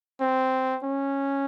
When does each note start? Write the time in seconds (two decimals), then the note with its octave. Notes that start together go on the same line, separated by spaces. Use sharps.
0.21 C4
0.83 C#4